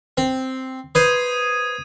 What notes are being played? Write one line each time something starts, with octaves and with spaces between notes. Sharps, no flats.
C4
B4 C5 D#6 G#6 D#7